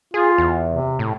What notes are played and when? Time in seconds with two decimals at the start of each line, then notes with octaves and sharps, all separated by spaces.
0.14 F4 G#4
0.38 E2
0.69 C3
0.99 A2